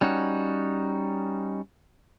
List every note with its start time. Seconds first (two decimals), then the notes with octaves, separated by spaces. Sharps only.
0.01 G3 C#4 D#4 F#4